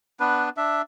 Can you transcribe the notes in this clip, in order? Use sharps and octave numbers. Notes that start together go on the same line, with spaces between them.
B3 D4 B4
D4 E5